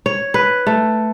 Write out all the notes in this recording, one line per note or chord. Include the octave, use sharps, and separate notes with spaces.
C#5
B4
A3